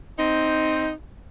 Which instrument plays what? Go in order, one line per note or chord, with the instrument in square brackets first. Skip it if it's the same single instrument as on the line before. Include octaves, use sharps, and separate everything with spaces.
[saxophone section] C4 D#4